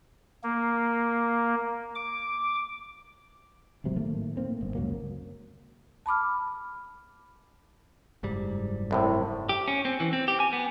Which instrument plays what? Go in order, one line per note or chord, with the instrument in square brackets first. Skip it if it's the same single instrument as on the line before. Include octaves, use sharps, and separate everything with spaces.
[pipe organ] A#3
D6
[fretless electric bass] D1 G#1 C3 F#3
A2 D#3 A3 A#3
A2 A#3 C4
G1
C#2 F#2 F#3 A#3
[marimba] A5 B5 D6 F6
[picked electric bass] F#1 G#2 G3
[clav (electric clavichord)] C2 A2 C3
[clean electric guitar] G4
C#4
C4
E3
C4
G4
G#5
B3